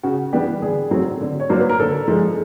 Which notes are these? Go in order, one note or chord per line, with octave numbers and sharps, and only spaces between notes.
C#3 F#4
E3 G3 B3 D4 G4
D3 G#4
F#3 A3 C4
D3
C#5
F#3 A#3 D4 C5
B4
A#4
D3 A4
F3 G#3